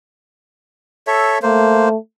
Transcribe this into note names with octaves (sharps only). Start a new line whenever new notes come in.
A4 C#5 E5
A3 A#3 C5